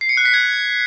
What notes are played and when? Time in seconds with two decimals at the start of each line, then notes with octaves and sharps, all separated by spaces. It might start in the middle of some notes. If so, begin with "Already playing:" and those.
0.01 C7
0.09 C#7
0.17 F#6
0.26 B6
0.34 G#6